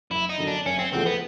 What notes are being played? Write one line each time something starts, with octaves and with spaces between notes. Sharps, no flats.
F#1 E4
D#4
F#2 D3
D4
F#1 C#4
C4
E2 C#3 F3 A3 C4
B3